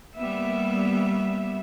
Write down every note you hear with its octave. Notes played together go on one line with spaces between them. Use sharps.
G3 A#3 B3 E5